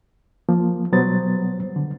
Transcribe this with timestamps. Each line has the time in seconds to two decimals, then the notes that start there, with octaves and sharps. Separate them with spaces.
0.49 F3 A#3
0.92 B2 F#3 G3 B3 C5 A6
1.76 D3